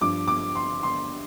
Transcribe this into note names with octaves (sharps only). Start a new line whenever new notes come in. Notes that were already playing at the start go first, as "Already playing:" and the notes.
G2 F3 D6
D6
C6
C6